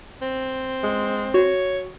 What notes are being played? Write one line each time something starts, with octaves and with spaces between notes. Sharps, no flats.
C4
G#3
F#4 C#5